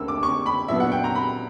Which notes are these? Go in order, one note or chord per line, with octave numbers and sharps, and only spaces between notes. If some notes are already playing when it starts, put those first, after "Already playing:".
Already playing: D2 D3 A#3 C#4 E6
D6
C#6
B5
A#2 F#3 B3 D4 E5
F#5
G5
A#5
B5